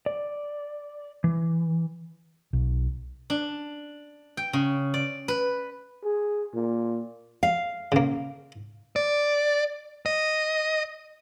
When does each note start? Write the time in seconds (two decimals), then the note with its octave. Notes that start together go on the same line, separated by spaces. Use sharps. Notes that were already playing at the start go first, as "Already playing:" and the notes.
0.06 D5
1.24 E3
2.53 B1
3.30 D4
4.37 G5
4.53 C#3
4.94 D5
5.28 B4
6.04 G#4
6.54 A#2
7.43 F5
7.92 C#3 A#3
8.96 D5
10.06 D#5